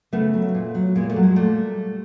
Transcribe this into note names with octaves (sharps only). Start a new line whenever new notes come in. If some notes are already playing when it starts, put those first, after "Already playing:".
C#3 A3 B3
F#3
A#2
F#3
A#2 G#3 A#3
G3 A3
F#3
G#3
A#2 G3 A3